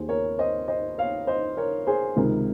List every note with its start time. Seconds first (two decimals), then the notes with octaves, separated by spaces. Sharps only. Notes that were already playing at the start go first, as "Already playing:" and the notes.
Already playing: D#2 D#3 G#4 C5
0.09 A#4 C#5
0.39 C5 D#5
0.68 C5 D#5
0.98 C#5 F5
1.27 C5 D#5
1.57 A#4 C#5
1.87 G#4 C5
2.16 C#2 C3 D#3 A#4